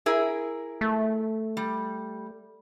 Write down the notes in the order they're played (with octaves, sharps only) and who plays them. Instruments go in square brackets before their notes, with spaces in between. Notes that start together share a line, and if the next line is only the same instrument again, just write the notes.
[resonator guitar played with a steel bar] E4 G#4 A#4
[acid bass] A3
[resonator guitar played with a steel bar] G3